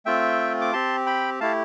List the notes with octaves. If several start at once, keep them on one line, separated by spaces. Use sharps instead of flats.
A3 C4 F4 E5 G5
D6
C4 G4 A5 C6
G5 B5
A3 E4 G4 F5 A5